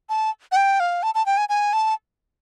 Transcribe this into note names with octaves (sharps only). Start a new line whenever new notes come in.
A5
F#5
G5
F5
A5
A5
G5
G#5
G#5
A5